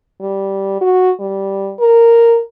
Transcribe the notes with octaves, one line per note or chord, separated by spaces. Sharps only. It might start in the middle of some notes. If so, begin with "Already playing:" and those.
G3
F#4
G3
A#4